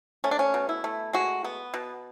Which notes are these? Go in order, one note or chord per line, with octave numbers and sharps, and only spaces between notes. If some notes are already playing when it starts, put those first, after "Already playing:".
A3 C#4
D4
C#4
B2
E4
A3
G#3 F#4
B3
B2